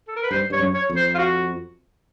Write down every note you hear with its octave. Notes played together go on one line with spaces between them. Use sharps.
A4
A#4
B4
G2 C5
G2 C#5
F#2
C#5
F2
C5
F4
F#4